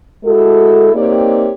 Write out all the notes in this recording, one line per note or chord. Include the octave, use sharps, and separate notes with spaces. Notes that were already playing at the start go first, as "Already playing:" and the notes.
G#3 E4 F#4 A4
A#3 C4 D#4 G4 C#5 D5